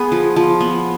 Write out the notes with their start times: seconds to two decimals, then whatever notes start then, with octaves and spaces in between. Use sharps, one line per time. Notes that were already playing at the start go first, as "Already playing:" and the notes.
Already playing: B3 G#4
0.12 F3
0.36 F3
0.61 B3